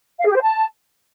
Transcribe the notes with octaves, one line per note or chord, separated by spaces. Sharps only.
F5
G#4
G4
C5
A5